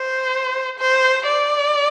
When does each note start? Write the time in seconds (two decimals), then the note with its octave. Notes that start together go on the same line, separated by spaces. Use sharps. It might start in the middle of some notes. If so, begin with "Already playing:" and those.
Already playing: C5
0.79 C5
1.26 D5